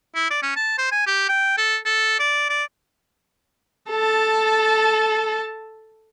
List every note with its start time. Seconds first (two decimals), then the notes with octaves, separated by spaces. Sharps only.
0.15 E4
0.30 D5
0.42 C#4
0.56 A5
0.78 C5
0.92 G#5
1.07 G4
1.29 G5
1.57 A4
1.85 A4
2.19 D5
2.49 D5
3.90 A4 A5